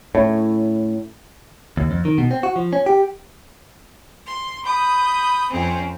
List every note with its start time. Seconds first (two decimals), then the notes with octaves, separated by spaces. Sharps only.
0.15 A2 C#4 E4 C#5
1.77 D#2
1.91 F2
2.05 D#3
2.18 B2
2.31 C4
2.43 F#4
2.56 F3
2.73 C#4
2.86 G4
4.26 C6
4.65 B5 D#6 G6
5.51 F2 C4 C#4